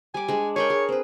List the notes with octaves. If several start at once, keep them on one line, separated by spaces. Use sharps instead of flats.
G3 G#5 D6
G#3 D4
G#4 A#4 C#5 G5
G#4
C4 B4